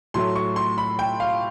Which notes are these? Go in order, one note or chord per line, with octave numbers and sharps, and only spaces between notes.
A2 F#3 A3 C6
C#6
C6
B5
G5
F5